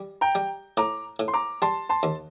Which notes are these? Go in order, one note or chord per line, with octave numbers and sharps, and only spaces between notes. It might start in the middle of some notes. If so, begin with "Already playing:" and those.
Already playing: G3
G5 A#5
G3
A2 A#5 D6
A2
C6
A#5 D6
G3 A5 C6
A5 C6
D#2